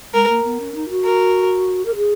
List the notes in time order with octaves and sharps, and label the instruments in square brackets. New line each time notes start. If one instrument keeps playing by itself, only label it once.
[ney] G#3 [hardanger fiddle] A#4
[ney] A#3
B3
C#4
D#4
F#4
[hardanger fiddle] A#4
[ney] A#4
G#4